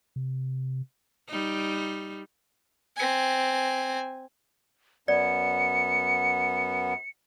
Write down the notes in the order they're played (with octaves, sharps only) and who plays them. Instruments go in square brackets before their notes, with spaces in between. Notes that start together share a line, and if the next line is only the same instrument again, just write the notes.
[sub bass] C3
[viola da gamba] G3 D#4
[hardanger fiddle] C4 G#5
[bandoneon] F#2 B3 [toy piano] D5 [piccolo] C#7